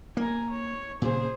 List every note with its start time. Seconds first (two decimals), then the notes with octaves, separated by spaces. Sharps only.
0.17 A#3 G#5 A#5
0.50 C#5
1.02 A#2 C#3 G#4 C5